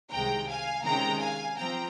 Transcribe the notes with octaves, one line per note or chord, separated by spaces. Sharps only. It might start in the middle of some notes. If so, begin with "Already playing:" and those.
C2 C3 D#3 G#3 G5 A#5
F5 G#5
C3 D#3 G#3 C#4 G5 A#5
F5 G#5
F3 C4 G5 A#5